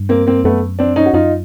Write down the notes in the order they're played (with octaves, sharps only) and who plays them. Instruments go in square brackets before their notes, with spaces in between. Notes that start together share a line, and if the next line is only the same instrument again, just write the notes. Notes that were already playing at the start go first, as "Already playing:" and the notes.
Already playing: [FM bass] G2
[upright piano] A#3 C4
A#3 C4
[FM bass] F#2 [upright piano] A3 B3
[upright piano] C4 D4
C#4 D#4
F#4
[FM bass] F#2 [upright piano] D#4 F4